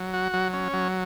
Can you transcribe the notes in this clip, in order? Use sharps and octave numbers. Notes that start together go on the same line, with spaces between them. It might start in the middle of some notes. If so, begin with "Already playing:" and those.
Already playing: F#3
F#4
F#3
C#4
F#3